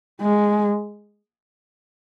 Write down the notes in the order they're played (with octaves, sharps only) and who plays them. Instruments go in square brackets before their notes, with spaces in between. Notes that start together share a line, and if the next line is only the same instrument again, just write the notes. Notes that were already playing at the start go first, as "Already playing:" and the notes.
[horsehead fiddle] G#3